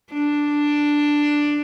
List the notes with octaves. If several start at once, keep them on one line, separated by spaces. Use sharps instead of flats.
D4